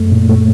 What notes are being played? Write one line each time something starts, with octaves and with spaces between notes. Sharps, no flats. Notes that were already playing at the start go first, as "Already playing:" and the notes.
Already playing: F#2 A3
A#2
A3